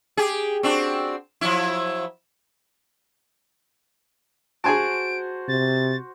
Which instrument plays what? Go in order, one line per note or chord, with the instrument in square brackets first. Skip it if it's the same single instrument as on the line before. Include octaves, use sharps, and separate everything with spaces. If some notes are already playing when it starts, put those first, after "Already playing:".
[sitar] G4 G#4
C4 D4 F#4
F3 F#3 E4
[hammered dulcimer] F#4 C5 [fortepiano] G#4 G#5 A5 [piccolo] D7
[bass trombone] C3 [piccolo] A6